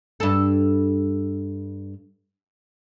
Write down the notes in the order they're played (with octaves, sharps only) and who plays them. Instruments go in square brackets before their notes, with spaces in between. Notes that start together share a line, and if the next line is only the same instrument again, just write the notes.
[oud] G2 A4